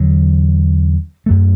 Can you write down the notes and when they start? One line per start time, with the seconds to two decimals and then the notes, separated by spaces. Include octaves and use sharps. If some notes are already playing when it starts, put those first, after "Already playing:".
Already playing: E2 D3 F#3
1.26 F#2 F#3 A3